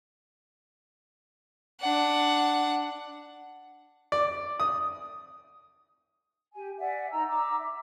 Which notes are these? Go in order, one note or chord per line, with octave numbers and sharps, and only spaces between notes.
D4 F#5
D5
D#6
G4 G#5
D5 E5 F#5 G#5
D#4 A#5 E6
A#5 D6 E6
E5